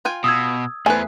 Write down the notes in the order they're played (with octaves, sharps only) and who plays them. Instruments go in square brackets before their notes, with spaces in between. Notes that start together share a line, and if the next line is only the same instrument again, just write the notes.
[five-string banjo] F4 G5 G#5
[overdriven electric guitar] B2 [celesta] D#6 E6 G#6
[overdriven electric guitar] E2 [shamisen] A3 G#5 [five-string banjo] B4 C5